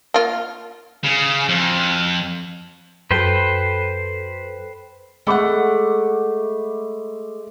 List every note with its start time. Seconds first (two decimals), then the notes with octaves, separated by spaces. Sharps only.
0.14 A#3 F4
1.04 C#3
1.49 F2
3.11 F#2 A4 B4 C5 G5
5.27 G#3 A3 F#5 B5 D6